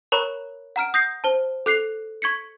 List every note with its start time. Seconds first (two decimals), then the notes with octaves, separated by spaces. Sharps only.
0.12 A#4 C#5 A#5 B5 C#6 F#6
0.76 F#5 A#5 F6 D7
0.94 D#6 G6 A#6 C7
1.24 C5 A5
1.66 A4 F#6 C7 F7
2.22 C#6 G#6 B6 C#7